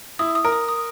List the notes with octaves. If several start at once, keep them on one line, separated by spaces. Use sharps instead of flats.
E4 D#6
D#6
A#4
D#6
D#6